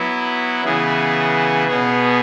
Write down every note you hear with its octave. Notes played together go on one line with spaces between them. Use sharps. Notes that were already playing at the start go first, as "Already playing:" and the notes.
Already playing: F#3 B3 E4
C#3 E3 B3 G#4
B2 B3 G#4